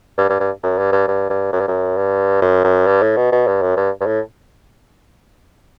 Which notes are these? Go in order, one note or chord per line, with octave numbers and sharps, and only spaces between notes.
G2
G2
G2
F#2
G2
G2
G2
G2
F#2
G2
F#2
G2
F#2
F#2
G2
A2
B2
B2
G2
F#2
G2
G2
A2